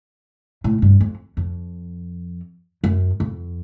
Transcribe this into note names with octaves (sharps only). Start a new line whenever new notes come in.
A2
G2
F2
F2
F#2
F2